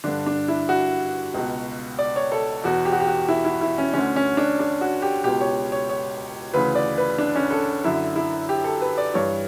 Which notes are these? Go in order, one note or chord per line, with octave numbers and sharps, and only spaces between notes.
G2 D3 D4
D4
E4
F#4
C#2 B2
D5
C#5
A4
E2 B2 F#4
G4
F#4
G4
F#4
E4
E4
E4
C#4
D2 D3 C#4
C#4
D4
D4
F#4
G4
C#2 B2 G4
C#5
C#5
C#5
D2 C#3 E3 B4
D5
B4
D4
C#4
A4
F#2 D3 E4
E4
G4
A4
B4
D5
G2 E3 C#5